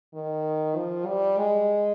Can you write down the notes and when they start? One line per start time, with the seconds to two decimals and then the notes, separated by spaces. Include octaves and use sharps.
0.14 D#3
0.76 F3
1.07 G3
1.37 G#3